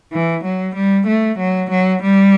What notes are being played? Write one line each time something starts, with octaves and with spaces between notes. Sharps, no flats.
E3
F#3
G3
A3
F#3
F#3
G3